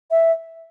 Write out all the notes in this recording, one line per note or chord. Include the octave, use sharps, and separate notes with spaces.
E5